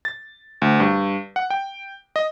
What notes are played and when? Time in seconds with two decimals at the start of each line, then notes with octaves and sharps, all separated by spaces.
0.05 A6
0.62 D2
0.80 G2
1.36 F#5
1.50 G5
2.16 D#5